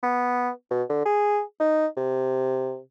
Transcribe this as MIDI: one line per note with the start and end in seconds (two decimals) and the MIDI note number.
0.03 0.50 59
0.71 0.83 47
0.90 1.05 50
1.05 1.41 68
1.60 1.87 63
1.97 2.79 48